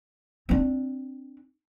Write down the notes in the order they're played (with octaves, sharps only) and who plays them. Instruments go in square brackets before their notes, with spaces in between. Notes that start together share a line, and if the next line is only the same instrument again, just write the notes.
[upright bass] C4 D4